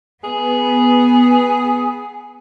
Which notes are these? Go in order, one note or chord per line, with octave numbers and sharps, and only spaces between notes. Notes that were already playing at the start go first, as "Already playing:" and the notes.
B3 G#4